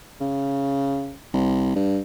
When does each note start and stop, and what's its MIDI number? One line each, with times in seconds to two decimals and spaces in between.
0.21 1.15 49
1.33 1.74 36
1.75 1.99 43